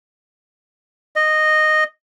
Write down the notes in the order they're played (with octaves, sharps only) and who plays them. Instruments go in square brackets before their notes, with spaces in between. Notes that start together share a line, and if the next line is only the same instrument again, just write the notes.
[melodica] D#5